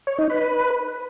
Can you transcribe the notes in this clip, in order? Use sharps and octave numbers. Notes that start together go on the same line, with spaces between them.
C#5
D#4
B4